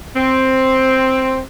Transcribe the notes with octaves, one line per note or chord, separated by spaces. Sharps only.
C4